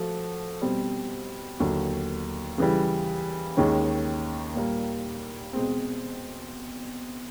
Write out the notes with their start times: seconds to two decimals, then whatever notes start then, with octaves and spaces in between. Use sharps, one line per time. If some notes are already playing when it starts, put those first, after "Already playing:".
Already playing: F3 A3 F#4
0.62 B2 G3 C4
1.60 D#2 D3 F#3
2.58 C#3 E3 G3
3.57 D#2 D#3 G#3 C#4
4.55 A#2 G3 A#3
5.53 B2 G#3 C4